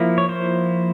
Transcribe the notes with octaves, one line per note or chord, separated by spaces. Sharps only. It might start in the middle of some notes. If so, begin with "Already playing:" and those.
Already playing: F3 A#3 E4
C#5
C5